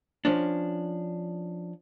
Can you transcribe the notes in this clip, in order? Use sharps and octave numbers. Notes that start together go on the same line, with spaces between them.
F3 C#4 D4